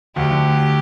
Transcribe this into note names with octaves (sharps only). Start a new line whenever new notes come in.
D2 D3 G4
D3